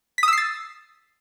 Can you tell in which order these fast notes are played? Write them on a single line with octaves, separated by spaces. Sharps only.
B6 D#6 E6 C7 A6